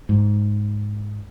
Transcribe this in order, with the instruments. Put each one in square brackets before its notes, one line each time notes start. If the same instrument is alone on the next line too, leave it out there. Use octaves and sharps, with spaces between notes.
[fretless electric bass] G#2